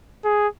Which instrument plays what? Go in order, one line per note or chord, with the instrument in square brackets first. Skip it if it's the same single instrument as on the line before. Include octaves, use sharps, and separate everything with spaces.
[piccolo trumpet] G#4